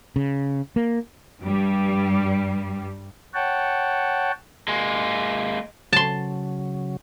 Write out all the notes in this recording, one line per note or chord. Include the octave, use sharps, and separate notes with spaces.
C#3
A#3
G2 G3
C#5 F#5 G5 A5
G#3 A#3
C#3 F#3 A5 C6